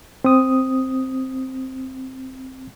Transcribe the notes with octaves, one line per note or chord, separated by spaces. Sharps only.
C4 D#6